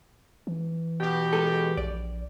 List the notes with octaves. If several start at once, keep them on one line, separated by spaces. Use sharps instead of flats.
E3
B2 G4
G#3 G#4 A4
A#1 D5